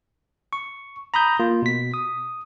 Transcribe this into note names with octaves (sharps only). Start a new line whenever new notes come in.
C#6
A#5 B5 D#6 G6
A#3 F4
B2 B6
D#6